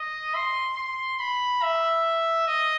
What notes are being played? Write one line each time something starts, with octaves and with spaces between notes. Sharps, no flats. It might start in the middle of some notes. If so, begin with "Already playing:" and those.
Already playing: D#5
C6
C6
B5
E5
D#5